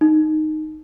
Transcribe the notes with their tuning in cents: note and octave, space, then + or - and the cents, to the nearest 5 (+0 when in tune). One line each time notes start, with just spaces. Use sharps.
D#4 -5